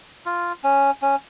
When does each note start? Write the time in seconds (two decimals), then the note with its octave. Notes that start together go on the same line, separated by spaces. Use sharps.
0.26 F4
0.64 C#4
1.02 C#4